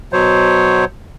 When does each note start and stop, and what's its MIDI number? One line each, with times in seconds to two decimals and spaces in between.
0.13 0.85 47
0.13 0.85 54
0.13 0.85 72
0.13 0.85 73